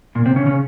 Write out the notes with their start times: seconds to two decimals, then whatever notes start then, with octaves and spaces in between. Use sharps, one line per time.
0.15 A#2 A#3
0.26 C3 C4
0.36 C#3 C#4
0.46 C#3 C#4